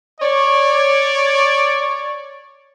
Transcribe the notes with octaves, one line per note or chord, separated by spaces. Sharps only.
C#5 D5